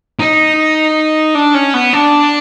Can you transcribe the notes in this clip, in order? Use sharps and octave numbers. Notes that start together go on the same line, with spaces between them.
D#4
D4
C#4
B3
D4